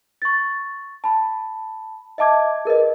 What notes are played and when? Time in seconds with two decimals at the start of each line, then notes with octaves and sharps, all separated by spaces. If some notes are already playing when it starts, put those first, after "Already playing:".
0.22 C#6 A6
1.04 A5 B5
2.18 D#5 E5 A5 D6 G#6
2.65 G#4 A#4 B4 D#5